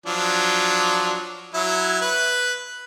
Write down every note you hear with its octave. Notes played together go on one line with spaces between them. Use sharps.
F3 F#3 D4
F#3 E4
B4